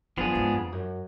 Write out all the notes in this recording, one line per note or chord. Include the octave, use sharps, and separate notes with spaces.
F#2 F3 B3 D4 G#4
G#2
F2
F#2